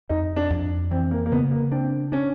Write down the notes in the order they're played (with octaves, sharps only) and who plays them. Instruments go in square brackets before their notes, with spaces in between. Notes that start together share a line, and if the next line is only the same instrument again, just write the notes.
[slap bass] F2 [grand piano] D#4
[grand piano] D4
[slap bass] F2
[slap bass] E3 [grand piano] C4
[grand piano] A#3
A#3
[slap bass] C#3 [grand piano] B3
[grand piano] A#3
[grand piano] C4 [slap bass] D4
[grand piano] C#4 [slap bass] D4